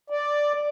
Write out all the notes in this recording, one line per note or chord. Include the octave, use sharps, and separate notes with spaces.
D5